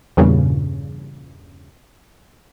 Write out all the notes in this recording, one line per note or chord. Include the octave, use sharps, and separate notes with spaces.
E2 G2 A#2 C#3